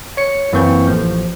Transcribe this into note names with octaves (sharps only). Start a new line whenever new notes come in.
C#5 C#7
F#2 E3 A#3 C4 C#6 G6
A1 F3